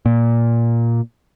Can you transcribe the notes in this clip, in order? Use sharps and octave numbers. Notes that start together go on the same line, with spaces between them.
A#2